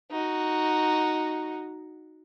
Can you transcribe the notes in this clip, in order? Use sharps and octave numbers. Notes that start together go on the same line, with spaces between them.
D#4 F#4